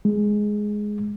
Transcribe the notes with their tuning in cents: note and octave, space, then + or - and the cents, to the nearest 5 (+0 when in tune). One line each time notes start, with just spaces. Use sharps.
G#3 +5